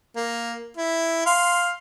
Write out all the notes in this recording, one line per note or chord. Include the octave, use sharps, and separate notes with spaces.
A#3
E4
F5 C6